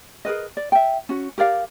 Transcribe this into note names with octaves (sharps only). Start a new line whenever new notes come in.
G#4 A#4 B4 D#5
D5
E5 G5
C#4 F#4
G4 A#4 D5 F5